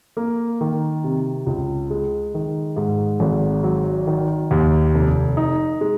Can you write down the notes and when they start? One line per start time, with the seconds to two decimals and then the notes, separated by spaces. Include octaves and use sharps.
0.17 A#3
0.61 D#3
1.04 C3
1.46 C#2
1.90 G#3
2.34 D#3
2.77 G#2
3.20 G#1
3.64 F#3
4.07 D#3
4.51 D#2
4.95 F1
5.37 D#4
5.81 G#3